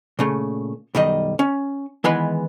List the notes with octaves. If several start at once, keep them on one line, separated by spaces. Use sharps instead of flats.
A#2 C#3 A3
B1 F#2 D#3 G3 D#5
C#4
D#3 E3 G#3 B3 B4